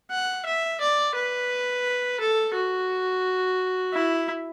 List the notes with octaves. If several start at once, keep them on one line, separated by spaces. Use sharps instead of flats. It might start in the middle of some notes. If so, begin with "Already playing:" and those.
F#5
E5
D5
B4
A4
F#4
E4